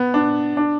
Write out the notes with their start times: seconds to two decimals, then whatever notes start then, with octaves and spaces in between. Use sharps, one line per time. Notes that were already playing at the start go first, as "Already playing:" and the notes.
Already playing: B3
0.14 D4
0.57 D4